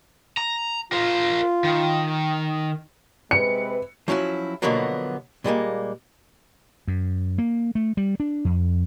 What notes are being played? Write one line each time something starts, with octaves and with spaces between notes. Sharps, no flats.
A#5
F4 A#4 C5
D#3
C3 G#3 B4 C#7
F3 F#3 C#4 E4 F#4
B2 D3 F3 F#3 A#3 B3
A#2 G3 G#3 A#3
F#2
A#3
A3
G3
D4
F2